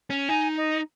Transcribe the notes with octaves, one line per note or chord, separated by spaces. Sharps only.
C#4
D#4 G#5
D#5